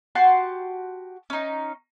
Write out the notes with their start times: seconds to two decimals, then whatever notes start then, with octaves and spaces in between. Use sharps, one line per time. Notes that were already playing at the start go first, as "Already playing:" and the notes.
0.15 F#4 G4 A5 C6
1.30 C#4 D#4